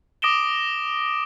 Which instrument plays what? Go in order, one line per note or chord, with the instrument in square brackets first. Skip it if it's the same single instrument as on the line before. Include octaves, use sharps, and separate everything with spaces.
[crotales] D6 D#6 A#6 D7 E7 G7